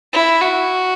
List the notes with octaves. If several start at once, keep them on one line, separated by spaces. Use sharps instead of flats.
E4
F#4